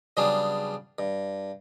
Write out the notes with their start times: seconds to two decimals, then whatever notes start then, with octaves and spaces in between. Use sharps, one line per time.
0.17 C#3 F#3 G3 B3 D4 G#4
0.99 G2